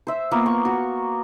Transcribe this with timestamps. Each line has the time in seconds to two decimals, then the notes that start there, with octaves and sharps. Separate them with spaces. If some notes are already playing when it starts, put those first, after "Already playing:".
0.07 C5 E5
0.31 A#3 B3 F4
0.46 C#6
0.65 F#4